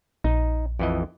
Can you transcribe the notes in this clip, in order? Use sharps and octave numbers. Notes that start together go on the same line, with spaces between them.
A#1 D#4
F2 E3 D#5